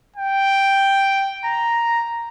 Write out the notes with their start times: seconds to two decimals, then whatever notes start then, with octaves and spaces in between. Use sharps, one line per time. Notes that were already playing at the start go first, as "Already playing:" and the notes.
0.16 G5
1.45 A#5